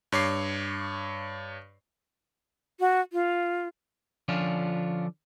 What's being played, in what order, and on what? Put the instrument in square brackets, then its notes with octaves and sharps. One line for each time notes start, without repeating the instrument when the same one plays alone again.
[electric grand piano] G2 C#5 D6 C7
[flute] F#4
F4
[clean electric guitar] D3 F3 C#4 D4 F4